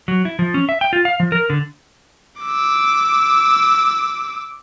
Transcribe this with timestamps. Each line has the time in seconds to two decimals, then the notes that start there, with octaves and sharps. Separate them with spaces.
0.08 F#3
0.25 E4
0.39 F3
0.54 C#4
0.69 E5
0.81 G5
0.93 F4
1.05 F5
1.20 F3
1.32 A#4
1.50 D3
2.42 D6 E6